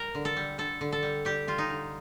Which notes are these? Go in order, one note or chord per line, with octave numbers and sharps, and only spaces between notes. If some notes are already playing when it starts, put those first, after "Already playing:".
Already playing: G3 A#4
D3
A4
G3
D3 A4
D3
A4
G3
G3 G4
G3 F4
D#4
D3